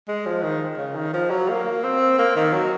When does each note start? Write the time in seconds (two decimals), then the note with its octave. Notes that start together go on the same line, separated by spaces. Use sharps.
0.08 G#3
0.26 F3
0.43 D#3
0.78 C#3
0.95 D#3
1.13 F3
1.30 F#3
1.49 A#3
1.84 C4
2.19 A#3
2.36 D#3
2.53 F#3